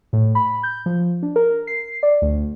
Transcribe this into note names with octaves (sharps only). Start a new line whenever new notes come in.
A2
B5
G6
F3
D4
A#4
C7
D5
D2